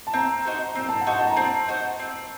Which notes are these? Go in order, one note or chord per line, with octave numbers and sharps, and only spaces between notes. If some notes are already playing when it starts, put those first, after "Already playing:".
A5
C4 A#5
D#4 F#4 C5
C4 A#5
A5
F#5
D#4 F#4 C5
A5
A#5
C4 A5
D#4 F#4 C5
C4